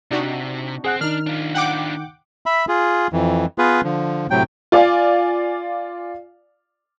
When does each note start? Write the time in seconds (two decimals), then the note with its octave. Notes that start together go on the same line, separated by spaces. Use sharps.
0.11 C3 D4 D#4 F#4
0.84 C4 G#4 F#5 F#6
1.01 D#3 D4 D#4 F6
1.27 D4 F4
1.54 F#5 G5 D6
2.46 E5 B5
2.68 F4 G#4
3.13 F2 E3
3.58 B3 F4 G#4 B4
3.84 D3 F3
4.31 A2 C3 F#3 G5
4.72 F4 D5 F5 G#5